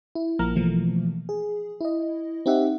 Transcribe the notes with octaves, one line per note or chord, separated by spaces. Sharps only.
E4
A#1 F3 A#3 A#5 F6
B2 E3 F3 A3 A#3
G#4
E4 D#5
C4 D#4 G4 E5 F#5